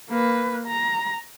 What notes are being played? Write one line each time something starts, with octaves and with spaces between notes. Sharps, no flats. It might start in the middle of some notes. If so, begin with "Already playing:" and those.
A#3 B4
A#5